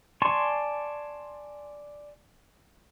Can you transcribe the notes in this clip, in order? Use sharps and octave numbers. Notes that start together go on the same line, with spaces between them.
D5 G#5 A5 C6 C#6